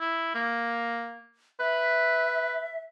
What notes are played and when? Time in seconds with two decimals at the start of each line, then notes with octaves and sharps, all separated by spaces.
0.01 E4
0.35 A#3
1.60 B4 E5